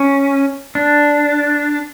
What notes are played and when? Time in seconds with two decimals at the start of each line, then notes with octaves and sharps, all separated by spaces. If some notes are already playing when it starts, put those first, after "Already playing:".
Already playing: C#4
0.75 D4